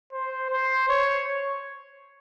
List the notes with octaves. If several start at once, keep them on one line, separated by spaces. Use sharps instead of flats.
C5
C5
C#5